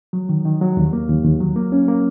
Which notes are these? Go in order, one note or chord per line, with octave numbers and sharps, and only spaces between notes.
F#3
D#3
D#3
F#3
D#2
A#3
D#2
D#2
F#3
A#3
C#4
A#3